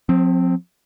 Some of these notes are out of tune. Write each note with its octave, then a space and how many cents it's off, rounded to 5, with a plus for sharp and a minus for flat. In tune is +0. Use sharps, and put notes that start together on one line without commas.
F3 +40 C4 +0